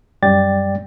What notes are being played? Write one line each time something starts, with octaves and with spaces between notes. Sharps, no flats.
F#2 G3 D5 G5 A6